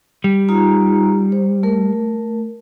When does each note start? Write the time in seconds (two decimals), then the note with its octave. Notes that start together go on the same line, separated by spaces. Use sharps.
0.24 G3
0.49 D#4 F4 A#5
1.32 C5
1.63 A3 A#4